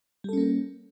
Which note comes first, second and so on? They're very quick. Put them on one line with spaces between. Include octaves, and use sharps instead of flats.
G3 A4 C#4 A#3